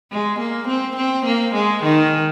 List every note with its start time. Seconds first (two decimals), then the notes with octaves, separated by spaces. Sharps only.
0.12 G#3
0.40 A#3
0.68 C4
0.97 C4
1.26 A#3
1.55 G#3
1.83 D#3